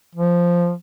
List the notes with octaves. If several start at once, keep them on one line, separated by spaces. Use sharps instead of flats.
F3